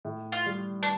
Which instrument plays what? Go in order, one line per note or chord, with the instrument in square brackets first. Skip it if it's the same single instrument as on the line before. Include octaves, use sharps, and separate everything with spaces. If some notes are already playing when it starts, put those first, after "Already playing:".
[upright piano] A2
[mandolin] F4
[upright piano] G3
[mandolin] D4